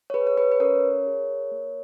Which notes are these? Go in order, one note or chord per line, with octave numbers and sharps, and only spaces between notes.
C#5
G#4 B4
C#5
B4
B4
C#4 A#4 C#5
G#4
A#3